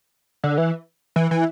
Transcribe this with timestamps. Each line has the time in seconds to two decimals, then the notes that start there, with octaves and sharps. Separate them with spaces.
0.44 D3
0.58 E3
1.16 E3
1.31 E3